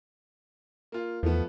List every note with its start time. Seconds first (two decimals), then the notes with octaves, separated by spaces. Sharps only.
0.92 A#3 F4
1.23 E2 F3 A3 B3